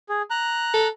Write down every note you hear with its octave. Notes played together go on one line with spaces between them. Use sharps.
G#4
A#5 F#6
A4